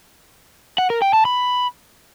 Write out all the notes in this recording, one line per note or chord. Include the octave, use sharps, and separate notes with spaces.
F#5
A#4
G5
A5
B5